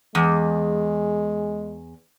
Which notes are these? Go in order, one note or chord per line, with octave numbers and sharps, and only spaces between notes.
E2 G#3